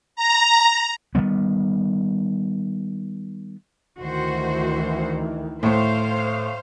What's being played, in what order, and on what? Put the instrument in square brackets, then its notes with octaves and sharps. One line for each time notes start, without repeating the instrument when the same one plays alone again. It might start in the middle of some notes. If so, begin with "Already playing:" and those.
[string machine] A#5
[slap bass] D#3 F#3 G3 B3
[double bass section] D2 D#3 E3 [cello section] F#4 C5
[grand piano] A2 A3 [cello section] C5 F5